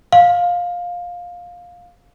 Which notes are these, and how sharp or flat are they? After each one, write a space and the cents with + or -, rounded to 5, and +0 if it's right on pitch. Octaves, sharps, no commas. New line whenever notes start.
F5 +15